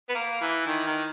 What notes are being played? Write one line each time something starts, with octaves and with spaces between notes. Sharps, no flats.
B3
A#3
E3
D#3
D#3